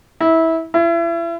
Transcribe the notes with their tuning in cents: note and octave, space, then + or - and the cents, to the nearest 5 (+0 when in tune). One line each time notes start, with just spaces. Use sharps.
E4 -20
E4 +35